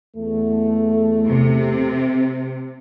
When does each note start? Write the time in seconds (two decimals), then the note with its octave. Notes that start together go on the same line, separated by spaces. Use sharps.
0.17 E2 A3
1.26 C3